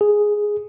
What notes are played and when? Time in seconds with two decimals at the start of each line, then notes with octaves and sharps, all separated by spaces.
0.01 G#4